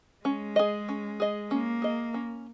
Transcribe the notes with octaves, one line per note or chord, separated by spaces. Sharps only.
G#3 C#4
G#4 D#5
C#4
G#4 D#5
A#3 C#4
G#4 D#5
C#4